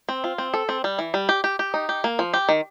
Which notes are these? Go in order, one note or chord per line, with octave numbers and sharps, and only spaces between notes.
C4
F4
C4
A4
C4
G3
E3
G3
G4
G4
G4
D#4
G4
A#3
F3
G4
D#3